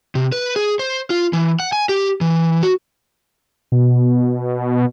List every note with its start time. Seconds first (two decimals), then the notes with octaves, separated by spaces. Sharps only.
0.15 C3
0.32 B4
0.56 G#4
0.79 C5
1.10 F4
1.33 E3
1.60 F#5
1.73 G#5
1.89 G4
2.21 E3
2.63 F#4
3.72 B2